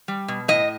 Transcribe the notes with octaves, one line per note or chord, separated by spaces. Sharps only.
G3
B2
A2 D#5